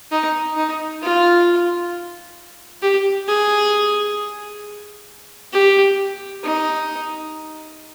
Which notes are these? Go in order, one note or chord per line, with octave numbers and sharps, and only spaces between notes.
D#4
D#4
F4
G4
G#4
G4
D#4